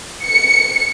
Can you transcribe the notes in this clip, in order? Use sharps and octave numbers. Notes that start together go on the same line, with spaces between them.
C#7